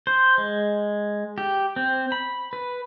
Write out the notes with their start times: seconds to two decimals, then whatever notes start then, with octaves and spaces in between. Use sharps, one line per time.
0.07 C5
0.38 G#3
1.38 G4
1.76 C4
2.12 B5
2.53 B4